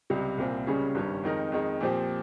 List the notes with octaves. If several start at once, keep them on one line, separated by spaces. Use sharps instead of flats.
C#2 C3 G3
C2 A#2 G3 C4 F4
C#2 C#3 G3 C#4 G#4
G#1 G2 G3 C#4
F2 D#3 G#3 D#4 A#4
F2 D#3 G#3
A#2 F3 C4 G4